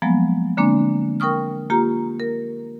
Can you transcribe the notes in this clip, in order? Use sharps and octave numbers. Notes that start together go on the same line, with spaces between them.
F3 F#3 G#3 A#3 B3
D3 G#3 A#3 C4 D4
A#4 G5 C#6 D#6 F6
A#3 F4 G4 A#5
A#4